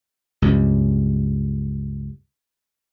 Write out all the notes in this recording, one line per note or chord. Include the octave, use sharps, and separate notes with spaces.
C#2 G2